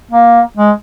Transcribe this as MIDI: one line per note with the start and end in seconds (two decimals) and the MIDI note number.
0.11 0.41 58
0.57 0.71 56